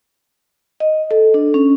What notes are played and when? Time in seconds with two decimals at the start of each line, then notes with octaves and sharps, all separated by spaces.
0.80 D#5
1.11 A4
1.34 D4
1.54 C#4